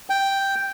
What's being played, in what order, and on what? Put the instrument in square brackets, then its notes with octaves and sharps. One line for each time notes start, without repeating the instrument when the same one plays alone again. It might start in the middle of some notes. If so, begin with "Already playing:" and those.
[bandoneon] G5